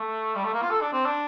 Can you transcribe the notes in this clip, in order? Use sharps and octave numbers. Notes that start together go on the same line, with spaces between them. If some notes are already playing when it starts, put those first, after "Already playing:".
Already playing: A3
G3
A3
A#3
F4
A4
D4
C4
D4